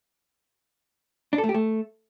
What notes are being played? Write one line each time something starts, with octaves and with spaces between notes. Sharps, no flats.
D4
A4
A3
G4
A3